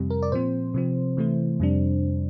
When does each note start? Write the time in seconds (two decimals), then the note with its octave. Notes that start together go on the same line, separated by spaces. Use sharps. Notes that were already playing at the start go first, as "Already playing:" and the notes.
Already playing: F2 C3 G3
0.10 A#4
0.22 D5
0.31 A#2 F3 C4 C5
0.74 C3 F3 C4
1.17 C3 E3 A3 E4
1.60 F2 C3 G3 D4